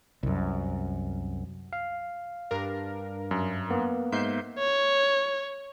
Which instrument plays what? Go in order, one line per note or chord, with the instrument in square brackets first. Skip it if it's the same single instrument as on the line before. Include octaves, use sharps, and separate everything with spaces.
[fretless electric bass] C2 F#2
[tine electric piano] F5
[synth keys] G2 D4 A#4
[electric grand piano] F#2
[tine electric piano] A#3 B3
[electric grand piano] G#2 [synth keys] E5 G6 C7
[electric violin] C#5